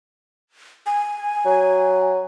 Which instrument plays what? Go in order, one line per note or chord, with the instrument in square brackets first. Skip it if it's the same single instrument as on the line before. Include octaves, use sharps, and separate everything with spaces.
[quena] G#5
[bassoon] F#3